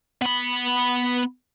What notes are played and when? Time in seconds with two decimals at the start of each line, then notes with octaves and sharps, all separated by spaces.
0.22 B3 B5